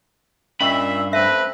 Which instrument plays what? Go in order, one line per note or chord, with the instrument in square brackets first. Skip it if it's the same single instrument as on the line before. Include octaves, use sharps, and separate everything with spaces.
[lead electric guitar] G2 B5 [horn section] A#2 E5 [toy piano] C#4 D#5 C#6
[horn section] A3 C4 B4 [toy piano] E5